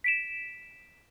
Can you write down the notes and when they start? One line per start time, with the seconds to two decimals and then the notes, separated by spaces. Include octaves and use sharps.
0.04 B6 D7 E7